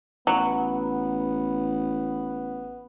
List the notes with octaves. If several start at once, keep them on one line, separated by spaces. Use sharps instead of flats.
A1 F#3 B3